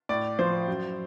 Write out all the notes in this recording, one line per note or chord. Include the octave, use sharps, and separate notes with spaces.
A2 D5
F3 C5
F#2